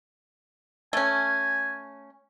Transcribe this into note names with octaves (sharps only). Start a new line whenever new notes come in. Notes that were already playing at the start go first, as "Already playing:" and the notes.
A3 C#4 G#5